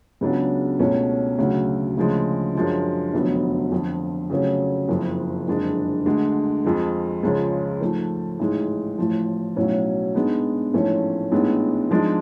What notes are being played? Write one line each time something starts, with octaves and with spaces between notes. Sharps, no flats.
C#2 C#3 F#3 B3 D4
C#2 B2 A3 C#4
D2 C#3 F#3
D2 C#3 F3 G#3
F#2 F3 G#3 D4
F1 F2 D3 F#3 B3
F2 D3 F3
F2 C#3 F#3 A3 C#4
F#1 F2 F3
F#1 F2 D3 G#3 D4
D2 D3 G#3
F2 F3 G#3
C#2 C#3 F3 G#3 C#4
G#2 F3 A3
A1 G#2 G#3
A1 A2 F3
B1 A2 F#3 C#4
G#2 G#3 B3 D4
A1 G#2 F3 A3 C#4
A1 G#2 G#3 B3 D4
G#2 F3 G#3 D4